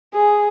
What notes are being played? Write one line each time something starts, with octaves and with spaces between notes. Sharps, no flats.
G#4